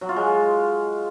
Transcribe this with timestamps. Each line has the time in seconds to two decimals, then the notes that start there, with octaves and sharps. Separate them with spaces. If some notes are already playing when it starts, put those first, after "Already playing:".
0.01 F#3
0.09 F4
0.16 G#3